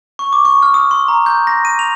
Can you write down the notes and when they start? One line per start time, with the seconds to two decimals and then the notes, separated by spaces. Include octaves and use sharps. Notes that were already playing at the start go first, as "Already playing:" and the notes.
0.19 C#6
0.33 D6
0.45 C#6
0.62 F6
0.74 D#6
0.91 C6
1.08 A#5
1.26 G6
1.47 A#6
1.65 D#7
1.79 F7